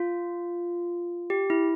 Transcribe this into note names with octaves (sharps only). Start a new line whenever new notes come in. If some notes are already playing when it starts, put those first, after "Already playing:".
Already playing: F4
G4
E4